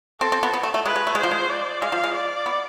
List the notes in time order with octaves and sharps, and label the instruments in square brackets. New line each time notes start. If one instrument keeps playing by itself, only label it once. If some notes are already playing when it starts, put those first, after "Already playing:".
[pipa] C4 [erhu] A4
[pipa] C4
B3
B3
A3
A3
[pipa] G#3 [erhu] B4
[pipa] G#3
A3
[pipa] G#3 [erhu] C5
[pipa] F3
G#3
[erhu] D5
[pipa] G#3 [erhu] F5
[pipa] F3
G#3
[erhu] D5
[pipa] B3